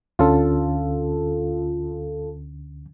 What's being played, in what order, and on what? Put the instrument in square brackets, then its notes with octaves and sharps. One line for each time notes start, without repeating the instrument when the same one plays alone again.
[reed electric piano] D2 D3 C#4 [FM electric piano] F4 A4